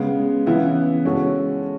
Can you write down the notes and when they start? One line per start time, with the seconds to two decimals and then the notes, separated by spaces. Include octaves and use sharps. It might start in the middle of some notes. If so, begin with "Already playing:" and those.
Already playing: C#3 G#3 B3
0.46 C#3 E3 B3 E4
1.05 G#3 C#4 F#4 A4